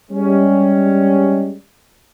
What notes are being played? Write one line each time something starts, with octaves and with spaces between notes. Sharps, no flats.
G3 G#3 C#4